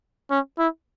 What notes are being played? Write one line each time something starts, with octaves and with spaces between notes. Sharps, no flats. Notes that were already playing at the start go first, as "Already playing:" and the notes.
C#4
E4